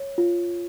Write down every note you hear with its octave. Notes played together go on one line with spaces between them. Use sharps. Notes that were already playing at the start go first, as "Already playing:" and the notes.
Already playing: C#5
F4